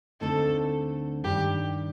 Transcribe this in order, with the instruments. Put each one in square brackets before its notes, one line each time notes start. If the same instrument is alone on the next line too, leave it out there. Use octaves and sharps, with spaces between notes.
[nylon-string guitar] D2 D3 A3 C4 D#4 [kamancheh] A4
[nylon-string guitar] G2 D#3 G3 D4 [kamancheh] G4